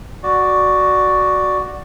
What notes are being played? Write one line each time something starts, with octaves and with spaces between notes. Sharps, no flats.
F#4 D5